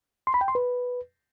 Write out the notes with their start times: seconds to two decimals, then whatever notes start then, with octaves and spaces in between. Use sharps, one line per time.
0.27 C6
0.34 B5
0.41 G5
0.48 C6
0.55 B4